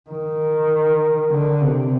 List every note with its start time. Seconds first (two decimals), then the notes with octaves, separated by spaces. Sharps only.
0.10 D#3
1.30 D3
1.61 C3